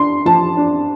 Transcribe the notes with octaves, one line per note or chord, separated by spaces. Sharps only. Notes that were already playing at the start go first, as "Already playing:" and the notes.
Already playing: D4 C6
F3 A5
D4